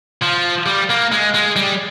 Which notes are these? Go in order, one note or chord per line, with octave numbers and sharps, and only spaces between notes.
F3
G3
A#3
G#3
G#3
G3